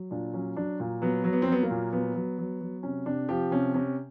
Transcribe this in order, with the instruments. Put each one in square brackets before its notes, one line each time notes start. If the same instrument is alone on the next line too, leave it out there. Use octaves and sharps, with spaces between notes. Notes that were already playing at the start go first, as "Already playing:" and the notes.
Already playing: [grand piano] F#3
A#2 D4
F#3 C#4
F#3 D4
A#2
F#3 B3
F#3
B3
C4
F#3 B3
A#3
A#2
F#3 B3
F#3
F#3
F#3
C3 C#4
C3 D4
F3 G4
C3 C#4
C3 C#4